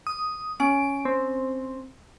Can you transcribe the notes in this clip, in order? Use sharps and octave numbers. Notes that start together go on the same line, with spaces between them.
D#6
C#4 D7
C4